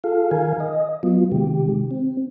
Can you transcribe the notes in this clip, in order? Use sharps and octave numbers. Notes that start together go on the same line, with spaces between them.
F4 G#4 A4 F5
D#3 A#4 F5 G#5
D#5
F#3 B3 F4
C3 D#3 G#3 G4
C4